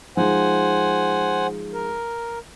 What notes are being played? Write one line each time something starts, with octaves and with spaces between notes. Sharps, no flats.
F3 G#3 D#4 C5 F#5 G#5
A#4